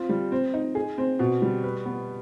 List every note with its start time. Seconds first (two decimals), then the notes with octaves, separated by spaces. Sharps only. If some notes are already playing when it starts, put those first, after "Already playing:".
Already playing: C4 F4
0.09 G3
0.32 C4
0.54 D#4
0.75 G#4
0.98 C4
1.19 B2
1.42 G3
1.64 B4
1.86 B3